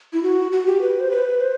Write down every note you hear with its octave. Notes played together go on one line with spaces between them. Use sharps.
E4
F#4
F#4
G4
B4
C5
B4
C5